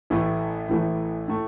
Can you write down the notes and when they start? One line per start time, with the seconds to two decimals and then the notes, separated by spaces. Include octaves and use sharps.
0.10 A1 A2 E3 A3 E4
0.68 A1 A2 E3 A3 E4
1.28 A2 A3